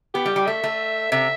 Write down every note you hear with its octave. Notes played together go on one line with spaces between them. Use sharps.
B3 G4
G3
G3
A3 E5
A3
C3 E5